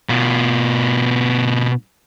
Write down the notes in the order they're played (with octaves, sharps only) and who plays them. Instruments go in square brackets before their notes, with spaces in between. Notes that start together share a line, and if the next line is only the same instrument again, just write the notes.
[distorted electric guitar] B2 F4